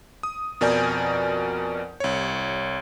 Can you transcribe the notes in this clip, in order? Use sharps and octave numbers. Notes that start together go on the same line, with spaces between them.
D#6
F2 B2 A#4 D5 G#5 G6
C2 C#5